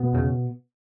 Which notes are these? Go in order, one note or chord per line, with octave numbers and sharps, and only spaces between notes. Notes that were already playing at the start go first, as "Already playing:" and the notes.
Already playing: B2 B3
E2 C#3